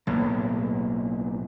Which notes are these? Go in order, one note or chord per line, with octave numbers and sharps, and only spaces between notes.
B1 A2 A#3